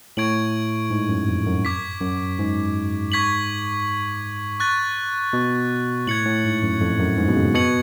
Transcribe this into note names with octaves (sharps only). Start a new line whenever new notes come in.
A2 C#6 G#6 D7 F#7
G#2
F#2
F2
F#2
D6 G#6 B6
F#2
G#2
C#6 G#6 B6 F#7
C#6 F#6 A6
B2
A2 G#6 C#7 F#7
A2
G#2
F#2
F2
F#2
G#2
B2
C#3
B2 C#6 G#6 C#7 F#7